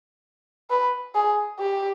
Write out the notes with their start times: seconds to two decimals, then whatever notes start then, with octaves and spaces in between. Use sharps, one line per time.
0.70 B4
1.15 G#4
1.59 G4